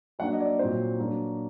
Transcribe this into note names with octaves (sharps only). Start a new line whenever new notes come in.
F#3 A#3 D4 F#5
D#5
D5
D#5
A#2 F#3 C4 C5
F#3 A#3 D4